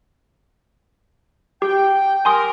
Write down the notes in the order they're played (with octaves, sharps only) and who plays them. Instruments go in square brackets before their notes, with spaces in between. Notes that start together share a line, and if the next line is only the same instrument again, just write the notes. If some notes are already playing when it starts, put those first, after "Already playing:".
[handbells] G4 [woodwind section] G5
[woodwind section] G4 A#4 [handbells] G#5 C6 D#6